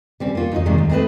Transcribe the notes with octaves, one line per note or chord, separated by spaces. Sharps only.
G3 C4 C#4
A#3 F4 F#4
F2 D#4 C#5 D#5
G#2 C3 D#3 G3 G#3 A#3
D#2
G#3 A3 C4 G#4 B4 D#5